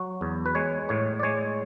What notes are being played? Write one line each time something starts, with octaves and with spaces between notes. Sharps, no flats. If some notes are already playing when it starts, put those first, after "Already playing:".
Already playing: F#3 F#4
E2
B4
G#3 C#5
A2 C#5
D5
G#3 C#5